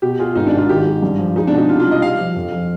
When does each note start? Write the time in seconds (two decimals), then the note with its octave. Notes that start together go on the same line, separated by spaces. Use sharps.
0.02 B2 G4
0.19 F4 G#4
0.36 G#1 D#4
0.47 D4
0.53 G#2 F4
0.69 D#3 G4
0.86 G#3
1.02 G2
1.19 F3
1.36 G#3 D#4
1.47 D4
1.53 B2
1.58 D#4
1.69 C3 F4
1.80 F4
1.86 G3
1.91 D#5
2.02 G4 F5
2.19 F3
2.36 F2
2.52 F3